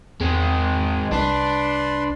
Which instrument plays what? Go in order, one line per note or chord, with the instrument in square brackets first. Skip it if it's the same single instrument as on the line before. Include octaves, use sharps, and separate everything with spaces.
[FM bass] E2 [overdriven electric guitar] G#3 C4
[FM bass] C2 [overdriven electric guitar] D4 [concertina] B4 C6